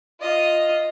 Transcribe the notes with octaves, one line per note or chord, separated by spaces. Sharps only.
F4 D#5